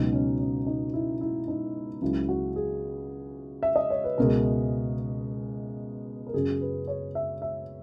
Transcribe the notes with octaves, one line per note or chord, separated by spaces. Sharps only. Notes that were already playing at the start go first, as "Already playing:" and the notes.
Already playing: C#2 B2 F#3 D#4
C#4
C#4
D#4
E4
E4
D#4
C#2 C#3 F#3 E4
F#4
G#4
E5
D#5
C#5
B4
C#2 B2 G#3 A#4
A#4
F#2 C#3 F#3 G#4
B4
C#5
E5
E5